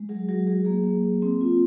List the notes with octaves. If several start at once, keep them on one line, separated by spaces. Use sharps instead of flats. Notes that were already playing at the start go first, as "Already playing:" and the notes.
Already playing: G#3
F#3 G#4
F#3 F#4
F#3 G#4
A#3 G#4
A#3
A#3
C4
F4